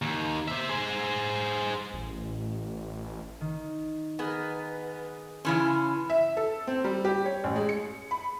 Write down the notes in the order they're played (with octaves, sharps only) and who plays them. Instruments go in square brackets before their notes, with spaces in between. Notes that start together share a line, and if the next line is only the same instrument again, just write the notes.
[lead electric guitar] D#2
C5 E5
G#4 C5
[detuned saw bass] A1
[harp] D#3
[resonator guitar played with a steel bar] B3 [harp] G#4 A#4
[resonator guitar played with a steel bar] C#3 E3 C#4 [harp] A5 C6 G#6
[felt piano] E5
A4
C4
G3
G4
C#5
A1
G#3
C#7
B5